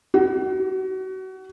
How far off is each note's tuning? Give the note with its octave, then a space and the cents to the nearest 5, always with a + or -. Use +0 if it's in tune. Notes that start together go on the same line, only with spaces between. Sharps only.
F#4 +30